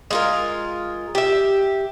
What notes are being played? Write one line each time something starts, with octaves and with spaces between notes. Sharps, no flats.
G#3 F4 A#4
G4 E5